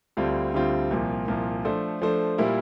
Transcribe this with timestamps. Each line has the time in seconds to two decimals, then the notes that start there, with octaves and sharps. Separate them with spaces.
0.17 D2 D3 G3 C4 F4
0.54 D2 D3 G3 C4 F4
0.91 C2 A#2 F3
1.28 C2 A#2 F3
1.65 F3 A3 D4 A4 C5
2.02 F3 A3 D4 A4 C5
2.38 A#2 G3 A#3 E4